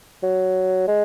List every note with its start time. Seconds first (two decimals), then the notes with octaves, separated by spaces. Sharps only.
0.23 F#3
0.88 G#3